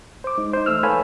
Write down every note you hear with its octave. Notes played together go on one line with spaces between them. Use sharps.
C5 D6
G#3 D#4
D#4 C5
E2 A3 E6 F6
A4 B4 C#5 F5 G#5 B5